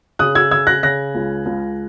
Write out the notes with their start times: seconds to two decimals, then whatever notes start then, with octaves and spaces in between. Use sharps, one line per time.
0.19 C#3 D#6 F#6
0.35 E6 G#6
0.51 C#3 E6 G#6
0.67 F#6 A#6
0.83 C#3 F#6 A#6
1.15 C#2
1.46 C#2